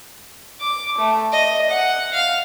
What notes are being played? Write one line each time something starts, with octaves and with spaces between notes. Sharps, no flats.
D6
A3
D#5
F#5
F5